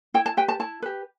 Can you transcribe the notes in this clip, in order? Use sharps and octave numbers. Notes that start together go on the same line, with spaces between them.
E4 G5
A5
G4 B4 G5
A5
E4 A5
G4 B4